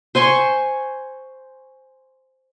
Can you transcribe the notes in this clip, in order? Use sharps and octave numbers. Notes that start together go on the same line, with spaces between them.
C5 G#5 C6 C#6